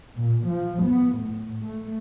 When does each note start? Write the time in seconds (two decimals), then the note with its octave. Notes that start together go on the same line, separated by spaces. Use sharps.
0.17 A#2
0.49 F3
0.85 B3
1.19 A2
1.66 A3